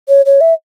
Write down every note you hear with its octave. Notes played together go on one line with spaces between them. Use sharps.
C#5
C#5
E5